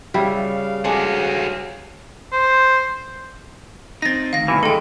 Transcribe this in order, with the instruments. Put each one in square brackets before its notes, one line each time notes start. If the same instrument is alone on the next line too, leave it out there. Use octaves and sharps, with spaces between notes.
[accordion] C#3 F5 [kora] G3 [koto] E4
[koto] G#3 D4 G#4 [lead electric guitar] F#4 A4
[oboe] C5
[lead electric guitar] C4 D#4 [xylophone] A6 A#6
[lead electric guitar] D2 D#3 [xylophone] F5 A#6
[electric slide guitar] G2 B2 E3
[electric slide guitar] E3 G#3 D#4 [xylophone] A4 G5